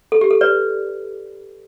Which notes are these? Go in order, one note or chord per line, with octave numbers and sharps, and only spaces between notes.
A4
G4
A4
B4 D5